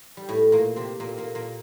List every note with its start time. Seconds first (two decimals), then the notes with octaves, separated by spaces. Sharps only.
0.17 G3
0.29 A2 A3
0.52 A#2 A#3
0.76 C3 C4
1.00 A#2 A#3
1.18 A#2 A#3
1.35 A#2 A#3